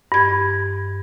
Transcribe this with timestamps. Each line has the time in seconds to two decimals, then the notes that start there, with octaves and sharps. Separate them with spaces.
0.12 G2 G#6